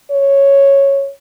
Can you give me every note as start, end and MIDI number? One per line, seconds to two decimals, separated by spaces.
0.11 1.10 73